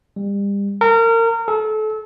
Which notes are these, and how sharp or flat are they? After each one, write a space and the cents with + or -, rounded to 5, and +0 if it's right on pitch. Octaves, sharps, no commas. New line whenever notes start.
G3 +35
A#4 -30
A4 -30